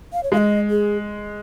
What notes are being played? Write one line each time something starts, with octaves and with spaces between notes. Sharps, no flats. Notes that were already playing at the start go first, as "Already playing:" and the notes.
F5
C#5
G#3 F5
D#5
G#4